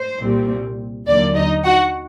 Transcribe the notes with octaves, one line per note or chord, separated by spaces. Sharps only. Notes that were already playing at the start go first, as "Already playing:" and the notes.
Already playing: C5
C2 A#2 G3 C4
D#2 D3 F#3 A#3 D5
D#4 D#5
F#4 F#5